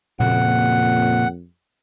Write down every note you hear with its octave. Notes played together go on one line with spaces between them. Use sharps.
F2 A#2 C#3 A#3 F#5